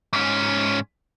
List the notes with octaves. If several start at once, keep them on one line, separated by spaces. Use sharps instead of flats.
G#2 C#4